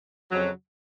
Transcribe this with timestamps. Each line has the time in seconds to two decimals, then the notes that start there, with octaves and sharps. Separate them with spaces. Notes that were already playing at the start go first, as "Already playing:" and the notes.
0.31 F2 C#3 F#3